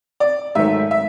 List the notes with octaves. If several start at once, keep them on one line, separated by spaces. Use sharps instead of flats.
D5
G#2 D#3 F#3 A3 E5
E5